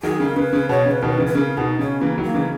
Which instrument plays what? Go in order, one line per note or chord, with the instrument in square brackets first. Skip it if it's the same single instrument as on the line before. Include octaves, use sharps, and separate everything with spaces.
[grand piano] D#3 F#3 [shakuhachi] G#4
[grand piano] C#3 [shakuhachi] A#4
[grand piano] C#3 [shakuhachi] B4
[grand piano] C#3
[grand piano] B2 [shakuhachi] C#5
[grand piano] C#3
[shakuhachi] B4
[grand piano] B2 D#3 [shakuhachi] A#4
[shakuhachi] B4
[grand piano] C#3 E3
[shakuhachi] B4
[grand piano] C#3 [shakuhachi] A#4
[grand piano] B2 [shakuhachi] D#4
[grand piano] C#3 [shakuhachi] C#4
[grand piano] C#3 E3 [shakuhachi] A#3
[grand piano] D#3 F#3
[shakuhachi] A#3
[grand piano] C#3 E3